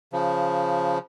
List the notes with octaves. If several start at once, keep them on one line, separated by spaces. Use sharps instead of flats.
C#3 F3